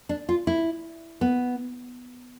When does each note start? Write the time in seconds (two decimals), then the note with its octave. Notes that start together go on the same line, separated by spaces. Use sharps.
0.09 D4
0.29 F4
0.47 E4
1.21 B3